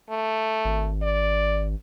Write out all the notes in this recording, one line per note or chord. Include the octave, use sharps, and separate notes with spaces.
A3
G#1
D5